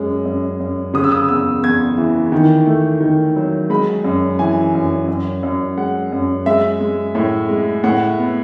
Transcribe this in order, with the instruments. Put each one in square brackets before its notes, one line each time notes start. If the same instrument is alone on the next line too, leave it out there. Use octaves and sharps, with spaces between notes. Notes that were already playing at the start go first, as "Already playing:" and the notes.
Already playing: [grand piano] F#2 G#3
F#2
F#2
C#3 D#6
E6
D#6
E2 E6
E2 G#6
E3
D#3
A3
D#3
F#3
G#3 B5
F#2
E3 G#5
F#2
F#2
F#2
G#3 F#5
F#2
G#3 E5
G#3
A2
G#3
A2 F#5
B3